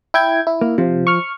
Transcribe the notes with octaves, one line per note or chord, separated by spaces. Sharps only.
E4 G5 G#6
E4
A#3
C3 F3
C#6 F6